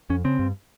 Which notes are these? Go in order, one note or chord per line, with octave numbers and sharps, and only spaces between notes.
F2 C#4
C#3 C4
G2